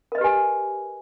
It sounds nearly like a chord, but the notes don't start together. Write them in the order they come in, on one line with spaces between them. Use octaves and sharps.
A#4 D#5 B4 G4 G#5